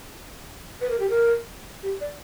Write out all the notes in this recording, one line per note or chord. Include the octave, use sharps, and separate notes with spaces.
B4
A#4
G4
A#4
G4
D5